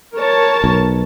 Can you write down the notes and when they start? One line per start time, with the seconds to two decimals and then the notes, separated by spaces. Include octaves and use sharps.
0.16 A#4 C#5 A5
0.64 B1